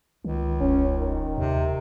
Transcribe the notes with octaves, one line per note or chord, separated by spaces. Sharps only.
C#2 D#3
D#1 C#4
D#3
D#2 C3